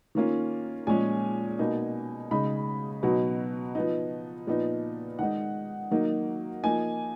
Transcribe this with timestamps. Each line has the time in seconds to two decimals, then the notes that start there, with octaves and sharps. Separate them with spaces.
0.15 D#3 A#3 C#4 F4
0.87 A#2 F3 G#3 C#4 G#5
1.59 B2 A#3 D#4
2.31 C#3 G#3 D#4 B5
3.03 B2 F#3 B3 D#4
3.75 F3 B3 D#4
4.47 A#2 F3 B3 D#4
5.19 D#3 G#3 D#4 F#5
5.91 D#3 F#3 A#3 D#4
6.63 F3 A#3 D#4 G#5